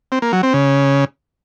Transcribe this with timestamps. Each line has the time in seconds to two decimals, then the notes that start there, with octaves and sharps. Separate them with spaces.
0.12 C4
0.22 A#3
0.33 F#3
0.43 C4
0.53 C#3